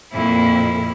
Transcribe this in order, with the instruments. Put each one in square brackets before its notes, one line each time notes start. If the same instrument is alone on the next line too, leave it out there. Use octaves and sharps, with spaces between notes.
[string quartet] F2 A#2 [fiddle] E4